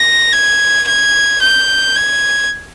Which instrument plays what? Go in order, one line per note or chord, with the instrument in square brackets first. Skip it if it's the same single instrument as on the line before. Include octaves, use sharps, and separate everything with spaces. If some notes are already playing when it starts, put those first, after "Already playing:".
Already playing: [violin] A#6
G#6
G#6
G6
G#6